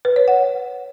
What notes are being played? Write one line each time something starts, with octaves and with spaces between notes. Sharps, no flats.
B4
C#5
F#5